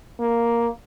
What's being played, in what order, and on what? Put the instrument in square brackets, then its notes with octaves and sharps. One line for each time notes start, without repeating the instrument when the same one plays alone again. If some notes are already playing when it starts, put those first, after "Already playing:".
[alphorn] A#3